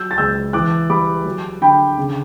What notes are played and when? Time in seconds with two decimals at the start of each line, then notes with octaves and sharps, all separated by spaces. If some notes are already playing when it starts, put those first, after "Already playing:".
Already playing: F#3 E6 G6
0.11 A6
0.18 C#2 E6 G6
0.53 E3 D6 F#6
0.90 G3 B5 D6
1.25 F#3
1.62 D3 G5 B5
1.98 C#3